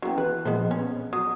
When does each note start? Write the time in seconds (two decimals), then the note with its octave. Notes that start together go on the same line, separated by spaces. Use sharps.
0.02 F#3 B3 C#4 E4 G5
0.18 E3 B4 F#6
0.45 A#2 F3 G#3 B3 C5
0.71 B3 C#4
1.13 F#3 D#6